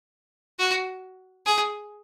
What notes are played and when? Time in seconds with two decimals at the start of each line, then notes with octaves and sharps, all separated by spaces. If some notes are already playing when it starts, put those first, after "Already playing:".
0.59 F#4
1.46 G#4